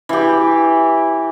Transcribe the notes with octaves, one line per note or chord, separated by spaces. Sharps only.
E3 G4